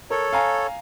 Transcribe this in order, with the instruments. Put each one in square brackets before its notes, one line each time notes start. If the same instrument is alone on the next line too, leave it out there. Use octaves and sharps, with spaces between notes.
[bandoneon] A4 C#5 [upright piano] A#4
[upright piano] F5 G#5 A#5